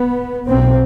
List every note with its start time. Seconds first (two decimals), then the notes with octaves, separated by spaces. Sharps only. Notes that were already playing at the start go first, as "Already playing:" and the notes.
Already playing: B3
0.47 B1 B2 C4